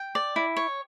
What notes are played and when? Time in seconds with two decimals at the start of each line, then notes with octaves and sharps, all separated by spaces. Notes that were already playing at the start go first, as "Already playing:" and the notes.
Already playing: G5
0.15 D5
0.36 E4
0.56 C#5